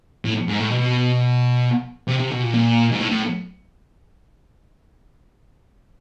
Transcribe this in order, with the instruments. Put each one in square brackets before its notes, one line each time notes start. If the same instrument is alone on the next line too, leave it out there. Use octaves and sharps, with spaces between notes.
[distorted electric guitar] A2
G#2
A2
B2
C3
C3
B2
A#2
A#2
G#2
A2
A2